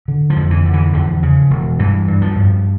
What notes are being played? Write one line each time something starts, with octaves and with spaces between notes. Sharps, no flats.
D3
F3
F2
E3
D3
E3
E2 F3
C#3
E1
G2 E3
G2
F3
G2